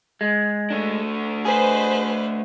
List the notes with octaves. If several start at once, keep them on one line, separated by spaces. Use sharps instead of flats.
G#3
A3 D4
G#4 B4 C5 D#5